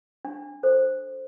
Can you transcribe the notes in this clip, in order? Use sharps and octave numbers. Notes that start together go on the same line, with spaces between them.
D4
A4 C5